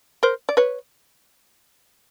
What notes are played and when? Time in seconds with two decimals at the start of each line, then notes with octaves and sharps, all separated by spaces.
0.23 A#4 C5
0.49 D5
0.57 B4 C#5